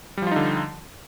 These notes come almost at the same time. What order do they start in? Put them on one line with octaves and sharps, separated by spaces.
G3 F3 F4 D#4 D3